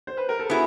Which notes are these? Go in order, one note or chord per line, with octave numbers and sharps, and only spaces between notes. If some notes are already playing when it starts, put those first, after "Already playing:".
C5
B4
A#4
A4
B3 E4 F#4 G#4